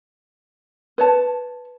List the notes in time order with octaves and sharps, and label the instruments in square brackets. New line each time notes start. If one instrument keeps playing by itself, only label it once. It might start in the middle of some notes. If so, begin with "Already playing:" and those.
[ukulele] B4 C#5 A5